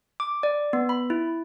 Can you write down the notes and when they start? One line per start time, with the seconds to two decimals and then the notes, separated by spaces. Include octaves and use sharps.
0.20 D6
0.43 D5
0.73 B3
0.89 B5
1.10 E4